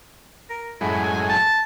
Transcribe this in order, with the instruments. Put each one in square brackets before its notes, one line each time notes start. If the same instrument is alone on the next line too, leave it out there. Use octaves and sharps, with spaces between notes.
[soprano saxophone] A#4
[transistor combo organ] F#2 A2 G#3 [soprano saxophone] E4
[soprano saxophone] G#5
A5